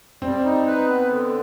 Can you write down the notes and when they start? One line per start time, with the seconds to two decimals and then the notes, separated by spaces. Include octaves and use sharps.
0.22 G3 C4
0.44 D#4
0.67 B4
0.88 B3
1.10 D3